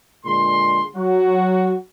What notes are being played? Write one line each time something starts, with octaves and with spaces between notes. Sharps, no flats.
A#2 D3 G#3 C6
F#3 F#4